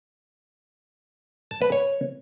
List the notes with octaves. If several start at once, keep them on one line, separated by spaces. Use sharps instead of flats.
A5
B4
C#5